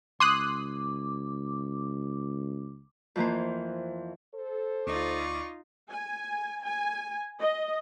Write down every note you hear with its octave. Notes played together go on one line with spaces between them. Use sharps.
C#2 C6 D6 D#6 F#6
F2 E3 A#3 C5
A4 C5
D2 D#4 F4 D5 C#6 D6
G#5
G#5
D#5